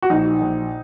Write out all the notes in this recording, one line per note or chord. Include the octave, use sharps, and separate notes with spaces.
F#4
A#1 D#4
A#1